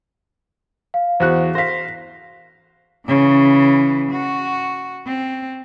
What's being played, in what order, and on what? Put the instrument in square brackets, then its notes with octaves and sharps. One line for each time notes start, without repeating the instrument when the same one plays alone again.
[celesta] F5
[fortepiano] E2 F#4 F#6 [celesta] C5
[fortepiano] C5 F5 [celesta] A#6 B6
[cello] C#3 E3
F#4
C4